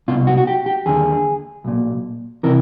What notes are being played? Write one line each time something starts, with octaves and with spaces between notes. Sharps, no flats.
C2 B2 F4
F#4
F#4
G4
G4
D#2 D3 G#4
B1 A#2
C3 E3 A#4